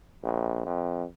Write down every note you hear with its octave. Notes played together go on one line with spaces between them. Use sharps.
A#1
F2